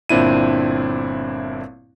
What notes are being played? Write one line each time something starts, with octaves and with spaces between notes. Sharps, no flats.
G1 A#2 C4 D4 E4 D#7